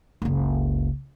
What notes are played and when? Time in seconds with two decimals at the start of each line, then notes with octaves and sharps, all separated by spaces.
0.22 F#1 C#2